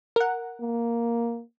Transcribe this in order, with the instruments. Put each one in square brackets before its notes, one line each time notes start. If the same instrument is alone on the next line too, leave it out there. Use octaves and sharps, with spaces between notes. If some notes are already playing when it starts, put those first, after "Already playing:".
[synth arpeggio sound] A#4 F#5
[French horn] A#3